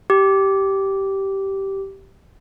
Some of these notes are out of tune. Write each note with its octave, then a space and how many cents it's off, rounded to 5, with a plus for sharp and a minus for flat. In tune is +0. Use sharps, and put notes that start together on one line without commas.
G4 -10